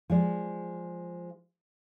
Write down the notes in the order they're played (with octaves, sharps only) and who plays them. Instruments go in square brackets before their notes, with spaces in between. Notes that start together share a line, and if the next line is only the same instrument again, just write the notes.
[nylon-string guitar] F3 G#3 D5